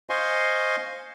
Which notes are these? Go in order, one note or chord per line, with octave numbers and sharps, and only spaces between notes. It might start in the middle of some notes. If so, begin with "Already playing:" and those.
C5 D#5 F5 G#5 C6 C#6